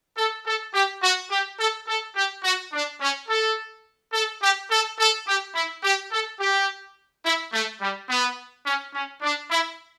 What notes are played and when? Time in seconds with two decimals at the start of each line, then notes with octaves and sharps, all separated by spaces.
0.18 A4
0.46 A4
0.74 G4
1.03 F#4
1.31 G4
1.59 A4
1.88 A4
2.16 G4
2.44 F#4
2.73 D4
3.01 C#4
3.29 A4
4.13 A4
4.42 G4
4.71 A4
4.99 A4
5.27 G4
5.55 E4
5.83 G4
6.12 A4
6.40 G4
7.25 E4
7.53 A3
7.81 G3
8.09 B3
8.66 C#4
8.94 C#4
9.22 D4
9.51 E4